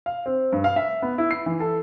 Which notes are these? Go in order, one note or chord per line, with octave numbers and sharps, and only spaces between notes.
F5
C4
G2
F5
E5
B3
E4
C7
E3
A4